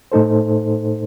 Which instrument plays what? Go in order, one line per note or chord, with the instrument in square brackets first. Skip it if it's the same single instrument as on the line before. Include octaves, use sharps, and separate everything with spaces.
[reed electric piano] A2 A3 D#4 A4 C5